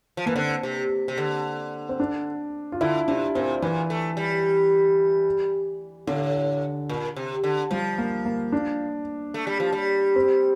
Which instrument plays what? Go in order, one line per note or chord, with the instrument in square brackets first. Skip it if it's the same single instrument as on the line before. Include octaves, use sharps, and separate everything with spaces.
[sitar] F3
[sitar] E3 [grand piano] A#3
[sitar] D3 [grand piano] C4
[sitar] C3
C3
D3
[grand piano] C4
D4
F4
[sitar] D3 [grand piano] E4
[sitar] C3 [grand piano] D4
[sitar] A#2 [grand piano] C4
[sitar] A#2 [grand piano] E3
[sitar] A3
G3
[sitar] A2 [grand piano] D3
[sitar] A#2
C3
D3
[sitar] F3 [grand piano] G3
[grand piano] A#3
A#3
D4
[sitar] A3
G3
F3
G3
[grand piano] C4